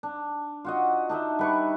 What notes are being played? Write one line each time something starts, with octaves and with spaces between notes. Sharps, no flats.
D4
F4 F#4 D#5
D4 D#4 D#5 E5
G3 B4 C#6